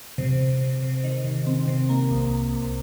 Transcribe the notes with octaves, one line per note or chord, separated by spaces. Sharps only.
C3
C3
C3
C3
D#3
C3
C4
C3
A#3
C2
C2
C2